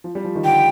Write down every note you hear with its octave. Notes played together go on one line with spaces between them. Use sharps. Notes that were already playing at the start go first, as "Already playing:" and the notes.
F3
G3
F3
D#3
D3 G5